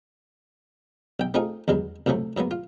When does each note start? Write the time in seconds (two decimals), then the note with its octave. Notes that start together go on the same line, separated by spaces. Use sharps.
1.20 B1 G5
1.34 A3 C4 D#4 F4 G#4
1.68 E2 G2 F#3 G#3
2.06 C2 A2 F3 F#3 A3
2.37 G#2 F#3 A#3 B3
2.51 F4